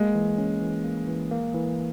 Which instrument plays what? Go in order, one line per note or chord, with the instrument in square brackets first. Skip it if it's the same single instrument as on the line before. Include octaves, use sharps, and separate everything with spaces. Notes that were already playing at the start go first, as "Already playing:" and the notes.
Already playing: [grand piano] G#3 [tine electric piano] A#3
[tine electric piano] E3
C#4
E3
A#3
E3
A#3
E3